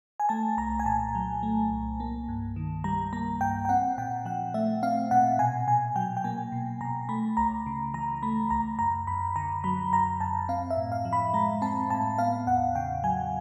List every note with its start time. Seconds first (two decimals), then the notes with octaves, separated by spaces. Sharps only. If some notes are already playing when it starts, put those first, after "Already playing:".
0.20 G#5
0.29 A3 A5
0.57 C2 A#5
0.79 G#5
0.86 A#2 A5
1.15 F#3
1.43 A3
1.71 C2
2.00 A#3
2.28 G2
2.56 D#3
2.84 G3 A#5
3.13 A#3 A#5
3.41 G2 G5
3.65 G5
3.69 C4 F#5
3.98 A#2 G5
4.25 F3 F#5
4.54 A3 E5
4.83 C4 F5
5.11 A#2 F#5
5.39 B2 G#5
5.67 B2 G#5
5.96 F#3 G5
6.17 G5
6.24 A#3 G#5
6.52 B2
6.81 B2 A#5
7.09 A3 B5
7.37 C#2 A#5
7.66 C#3
7.94 E3 A#5
8.22 A3 B5
8.50 C#2 A#5
8.79 F#2 A#5
9.07 F#2 B5
9.36 D3 A#5
9.64 F#3 B5
9.92 F#2 A#5
10.20 F#2 A5
10.49 C4 F5
10.70 E5
10.77 A2
10.92 F5
11.05 F3
11.13 B5
11.33 G#3 A#5
11.62 C4 A5
11.90 A2 A5
12.18 B3 F5
12.47 E2 F#5
12.75 C#3 G5
13.04 F#3 G#5